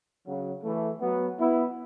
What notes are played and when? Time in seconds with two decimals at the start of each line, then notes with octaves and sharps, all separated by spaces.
0.25 C#3 F#3
0.63 E3 A3
1.00 F#3 B3
1.38 B3 E4